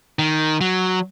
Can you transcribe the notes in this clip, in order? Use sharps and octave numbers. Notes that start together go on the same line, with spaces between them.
D#3
F#3